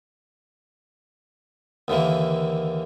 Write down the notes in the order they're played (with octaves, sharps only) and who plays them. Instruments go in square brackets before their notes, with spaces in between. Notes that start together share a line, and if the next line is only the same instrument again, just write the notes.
[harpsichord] D#2 D3 E3 A#3